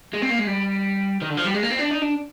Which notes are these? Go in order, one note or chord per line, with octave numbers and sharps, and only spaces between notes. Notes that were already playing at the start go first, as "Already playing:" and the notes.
G#3
C4
A#3
G#3
G3
D#3
D3
F3
G3
G#3
A#3
C4
D4
D#4
D4